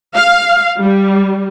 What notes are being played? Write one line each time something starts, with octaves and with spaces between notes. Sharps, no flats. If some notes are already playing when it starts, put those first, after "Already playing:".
F5
G3